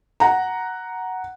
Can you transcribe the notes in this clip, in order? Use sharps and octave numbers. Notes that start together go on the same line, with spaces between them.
F#5 A#5